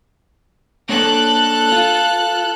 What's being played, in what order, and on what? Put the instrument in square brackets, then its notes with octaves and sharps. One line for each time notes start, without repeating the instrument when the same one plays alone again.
[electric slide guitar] A#3 D4 C#5 [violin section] A4 F#6
[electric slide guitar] F4